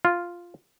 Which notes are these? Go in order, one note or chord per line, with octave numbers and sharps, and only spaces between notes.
F4